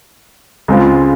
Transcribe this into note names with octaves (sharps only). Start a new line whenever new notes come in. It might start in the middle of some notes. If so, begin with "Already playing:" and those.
C#2 C#3 G#3 C4 F4